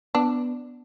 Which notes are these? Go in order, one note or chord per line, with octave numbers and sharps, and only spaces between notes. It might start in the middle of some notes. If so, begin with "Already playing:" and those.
B3 D4